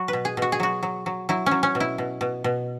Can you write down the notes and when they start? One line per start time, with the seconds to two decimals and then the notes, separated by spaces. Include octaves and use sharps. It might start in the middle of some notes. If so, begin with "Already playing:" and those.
Already playing: F#3 F#4
0.08 B4
0.13 B2
0.25 G#4
0.37 B2 F#4
0.52 G#4
0.60 F#3 F#4
0.83 F#3
1.06 F#3
1.29 F#3 E4
1.46 F#3 C#4
1.63 C#4
1.75 B2
1.80 E4
1.98 B2
2.21 B2
2.44 B2